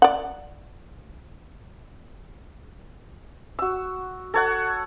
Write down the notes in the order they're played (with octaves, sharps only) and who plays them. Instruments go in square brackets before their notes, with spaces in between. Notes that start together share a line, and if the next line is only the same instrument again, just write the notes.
[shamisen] D5 F#5
[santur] F#4 E6
A4 C#5 F#5